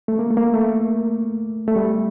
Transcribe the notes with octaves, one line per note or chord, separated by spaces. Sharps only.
A3
A#3
A3
A#3
A3
A3
G3